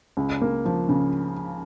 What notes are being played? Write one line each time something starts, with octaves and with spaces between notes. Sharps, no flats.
C#2
A#3
F3
C#3